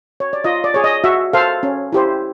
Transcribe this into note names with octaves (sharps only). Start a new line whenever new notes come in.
C#5
D5
F4 D#5
D5
G#4 C#5
D#5
F#4 E5
A4 C5 F5
C#4
E4 G4 C5